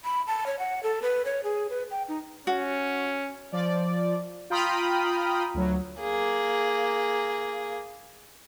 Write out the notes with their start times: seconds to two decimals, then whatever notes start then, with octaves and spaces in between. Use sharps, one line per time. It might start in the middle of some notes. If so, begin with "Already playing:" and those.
0.04 B5
0.27 A5
0.46 C#5
0.59 F#5
0.83 A4
1.02 B4
1.25 C#5
1.44 G#4
1.70 B4
1.91 G5
2.08 D#4
2.47 C#4 F#4
3.52 F3 D5
4.50 F4 G5 A#5 B5 D#6 F6
5.54 D2 F#3
6.00 A#3 G#4